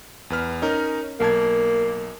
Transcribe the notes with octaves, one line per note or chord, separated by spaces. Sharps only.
E2 B4 F6
C#4 D#4 A#4
B1 A#3 A5 G#6